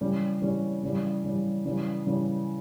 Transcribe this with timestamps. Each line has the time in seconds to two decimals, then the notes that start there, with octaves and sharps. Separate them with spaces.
0.01 C#3 E3 G3 C#4
0.42 C#3 E3 G3 C#4
0.83 C#3 E3 G3
1.24 C#3 E3 G3
1.65 C#3 E3 G3
2.07 C#3 E3 G3